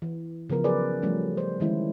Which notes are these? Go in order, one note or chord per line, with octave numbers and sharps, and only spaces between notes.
E3
C#3 F3 B3 A#4
F#3 B3 G#4 A#4 B4 D5
F3 G3 A3 C#4
C5
D#3 E3 G#3 C#4 E4